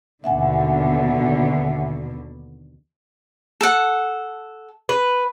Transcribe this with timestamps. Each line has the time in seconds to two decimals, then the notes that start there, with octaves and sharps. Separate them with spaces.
0.24 D#2 B2 D3 E5 F#5 G#5
3.61 A4 F#5
4.89 B4